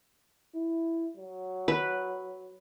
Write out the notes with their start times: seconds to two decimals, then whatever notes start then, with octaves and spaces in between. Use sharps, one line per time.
0.55 E4
1.17 F#3
1.68 B4